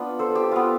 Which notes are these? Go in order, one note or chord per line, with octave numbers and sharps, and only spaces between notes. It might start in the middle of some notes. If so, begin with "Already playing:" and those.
Already playing: B3 D4 F4 B4
A4 C5
G4
B3 F4